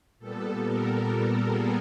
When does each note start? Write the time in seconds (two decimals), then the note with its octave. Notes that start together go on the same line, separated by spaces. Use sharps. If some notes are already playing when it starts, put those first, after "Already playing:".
0.19 A#2 G3 B3 A4
0.62 A#4
1.47 G#4